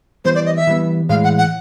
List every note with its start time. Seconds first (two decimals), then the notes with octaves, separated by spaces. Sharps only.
0.25 E3 G3 B3 C5
0.35 D5
0.46 D#5
0.56 E5
0.67 E3 G3 B3
1.09 A2 E3 G#3 F5
1.24 F#5
1.38 F#5